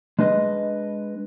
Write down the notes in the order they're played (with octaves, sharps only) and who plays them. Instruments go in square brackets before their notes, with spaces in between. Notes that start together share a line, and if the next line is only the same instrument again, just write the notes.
[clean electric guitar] G#3 D4 B4 D#5